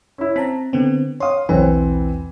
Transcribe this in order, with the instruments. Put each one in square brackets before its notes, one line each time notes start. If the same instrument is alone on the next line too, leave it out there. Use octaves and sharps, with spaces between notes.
[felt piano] C#4 E4
[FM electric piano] C4 A5 A#5 [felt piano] B6
[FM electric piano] D3 B3 C4
[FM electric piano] C#5 D#6 [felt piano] F5 C6
[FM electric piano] B1 E2 B4 [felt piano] E3 C4 C5